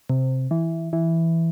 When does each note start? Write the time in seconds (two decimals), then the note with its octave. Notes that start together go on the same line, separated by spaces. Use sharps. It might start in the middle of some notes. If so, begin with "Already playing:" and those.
0.09 C3
0.51 E3
0.93 E3